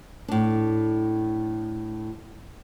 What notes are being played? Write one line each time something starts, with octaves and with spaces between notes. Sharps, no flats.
A2 D4